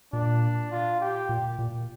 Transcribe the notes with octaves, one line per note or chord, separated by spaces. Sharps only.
A#2 D4
F4
G4
A#2
A#2